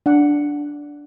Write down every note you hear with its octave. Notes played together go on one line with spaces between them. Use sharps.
D4 F#5